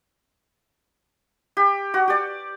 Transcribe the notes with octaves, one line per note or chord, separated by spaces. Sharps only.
G4
F#4
G4 D5